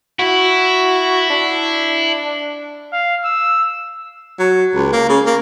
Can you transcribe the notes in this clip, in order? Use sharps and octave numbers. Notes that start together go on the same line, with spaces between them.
E4 F#4
D4
F5
E6
F#3
C#2
A#3
C#3
A#3